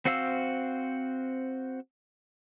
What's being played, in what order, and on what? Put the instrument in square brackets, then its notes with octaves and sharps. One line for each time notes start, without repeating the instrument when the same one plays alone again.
[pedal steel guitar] C4 F#4 C5 F5 E6